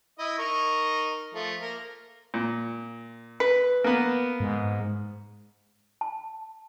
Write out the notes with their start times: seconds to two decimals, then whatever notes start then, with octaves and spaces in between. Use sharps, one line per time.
0.19 E4 D#5
0.39 D#4 A#4 C#6
1.34 F3 A3
1.62 A#3 A#4
2.34 A#2
3.40 B4
3.84 A#3 B3
4.40 G#2
6.01 A5